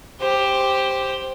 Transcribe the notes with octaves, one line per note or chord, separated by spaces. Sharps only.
G4 C5